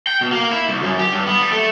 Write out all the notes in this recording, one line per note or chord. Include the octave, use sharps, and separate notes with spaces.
G5
B2
A#3
E4
C2
F#2
G4
G2
B3
G3
A3